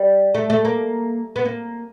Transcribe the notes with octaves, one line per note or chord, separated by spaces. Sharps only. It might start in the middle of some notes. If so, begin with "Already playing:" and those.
Already playing: G3
A3
A3
A#3
B3
A#3